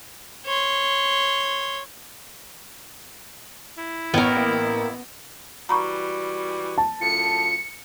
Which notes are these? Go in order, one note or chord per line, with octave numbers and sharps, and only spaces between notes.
C#5 C6
E4
A1 B3 A#4 C#5 G5
A#3
E3 G3 F#4 A#5 B5 C#6
A5
F#2 A2 F4 C#7